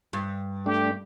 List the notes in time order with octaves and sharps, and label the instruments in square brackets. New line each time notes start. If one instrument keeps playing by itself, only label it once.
[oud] G2
[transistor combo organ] A3 D4 [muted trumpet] G4